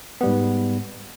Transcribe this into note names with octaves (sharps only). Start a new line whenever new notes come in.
G#2 G3 B3